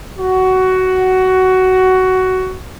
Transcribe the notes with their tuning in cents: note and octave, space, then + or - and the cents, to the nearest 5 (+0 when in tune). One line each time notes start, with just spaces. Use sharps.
F#4 +15